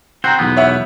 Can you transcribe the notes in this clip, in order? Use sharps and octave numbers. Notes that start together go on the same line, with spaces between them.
C4 F#4 C5 A#5 G6
B1 E2 B3
C#5 E5 F#5